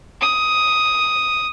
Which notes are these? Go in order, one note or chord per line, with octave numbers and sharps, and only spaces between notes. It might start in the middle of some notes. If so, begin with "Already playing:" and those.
D#6